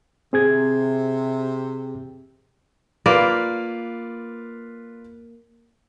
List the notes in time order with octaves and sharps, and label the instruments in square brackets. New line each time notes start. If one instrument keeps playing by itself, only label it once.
[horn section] C3 [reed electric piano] C4 G#4 G#6
[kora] A#3 [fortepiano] F4 B4 D5